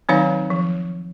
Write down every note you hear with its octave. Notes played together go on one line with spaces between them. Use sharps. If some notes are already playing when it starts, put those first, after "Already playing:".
D#3 F#3 C4 D#4 C#5 F5
F3